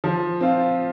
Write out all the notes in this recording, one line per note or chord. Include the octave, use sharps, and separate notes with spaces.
F3
C4 F4